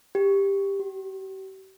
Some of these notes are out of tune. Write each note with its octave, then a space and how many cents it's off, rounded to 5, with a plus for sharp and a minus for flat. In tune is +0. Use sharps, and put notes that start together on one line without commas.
G4 +10
G4 -45